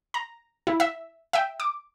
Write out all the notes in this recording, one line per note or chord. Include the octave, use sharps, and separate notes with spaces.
A#5
E4
E5
E5 G5
D6